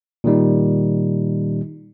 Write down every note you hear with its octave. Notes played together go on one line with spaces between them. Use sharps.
A#2 D#3 G3 D#4